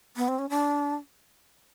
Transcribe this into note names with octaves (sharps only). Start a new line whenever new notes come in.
B3
C4
C#4
D4